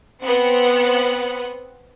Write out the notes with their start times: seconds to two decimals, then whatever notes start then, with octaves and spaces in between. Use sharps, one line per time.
0.23 B3 C4 F#5